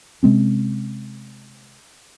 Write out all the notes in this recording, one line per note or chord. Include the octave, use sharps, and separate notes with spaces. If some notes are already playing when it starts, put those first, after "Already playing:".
C3 G#3 C4 C#4